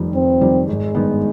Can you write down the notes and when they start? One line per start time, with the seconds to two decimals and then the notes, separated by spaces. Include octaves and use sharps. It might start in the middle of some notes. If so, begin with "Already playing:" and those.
Already playing: F1 F2 D#3 G3
0.15 F1 C4
0.41 F2 D#3 G3
0.68 G#1 G#3
0.95 G2 D#3 B3